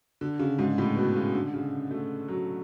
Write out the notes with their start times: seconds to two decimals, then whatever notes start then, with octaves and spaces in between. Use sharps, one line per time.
0.21 D3
0.39 C#3
0.59 G#2
0.78 A2
0.96 B2
1.16 C#3
1.34 D3
1.54 C#3
1.91 A3
2.28 F#3